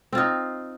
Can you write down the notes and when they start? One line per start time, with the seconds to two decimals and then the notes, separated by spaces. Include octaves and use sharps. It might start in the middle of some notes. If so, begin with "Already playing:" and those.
0.13 C4
0.15 F4
0.18 D#4